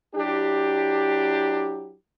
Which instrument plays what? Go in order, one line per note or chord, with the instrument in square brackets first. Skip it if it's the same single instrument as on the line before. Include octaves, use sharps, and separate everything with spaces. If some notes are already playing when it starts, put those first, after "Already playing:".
[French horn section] F#3 D4 E4 G4